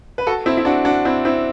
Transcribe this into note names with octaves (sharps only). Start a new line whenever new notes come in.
B4
F#4 A4
C4 E4
E4
D4 F#4
D4 F#4
C4 E4
C4 E4